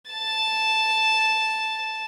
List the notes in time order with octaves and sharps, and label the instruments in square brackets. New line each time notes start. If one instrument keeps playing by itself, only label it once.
[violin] A5 A6